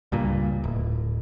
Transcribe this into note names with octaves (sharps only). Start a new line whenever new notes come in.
C#2 G2 A#2
D1